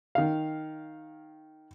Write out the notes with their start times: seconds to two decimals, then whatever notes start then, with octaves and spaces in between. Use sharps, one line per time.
0.15 D#3 F5